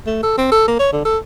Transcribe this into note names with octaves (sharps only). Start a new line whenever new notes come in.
A3
A4
C4
A4
A#3
C#5
D3
A4